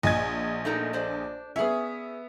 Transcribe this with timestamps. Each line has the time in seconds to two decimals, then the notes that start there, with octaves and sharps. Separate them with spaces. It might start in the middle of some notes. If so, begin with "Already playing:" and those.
0.03 A#1 D#5 G#5 G#6
0.65 A3 D#4 A#4
0.93 D4 C5 D5
1.56 B3 C#4 G#4 E5